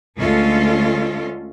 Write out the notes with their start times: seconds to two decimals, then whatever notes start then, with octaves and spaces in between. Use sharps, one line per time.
0.17 D2 G#3 C#4 F4 A4